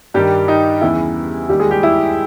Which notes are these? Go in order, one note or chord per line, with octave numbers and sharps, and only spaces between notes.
G2 D#3 G3 G4
D#4
E2 C#3 E3 E4
D#2 D#3 G3 G4
G#3 G#4
G3 G4
E4